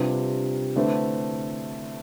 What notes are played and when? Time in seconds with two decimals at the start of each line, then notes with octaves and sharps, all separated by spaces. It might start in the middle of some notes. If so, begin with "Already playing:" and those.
Already playing: C3 G3 D4 F4 B4
0.76 D3 A3 C4 E4 B4